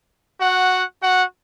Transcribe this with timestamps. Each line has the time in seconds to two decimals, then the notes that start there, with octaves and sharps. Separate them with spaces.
0.40 F#4 F#5
1.02 F#4 F#5